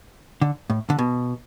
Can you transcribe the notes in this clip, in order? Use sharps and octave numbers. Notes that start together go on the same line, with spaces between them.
D3
A2
D3
B2